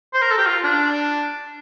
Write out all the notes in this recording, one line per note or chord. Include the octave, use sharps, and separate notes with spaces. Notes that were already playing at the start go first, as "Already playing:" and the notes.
C5
A#4
A4
G4
F4
D4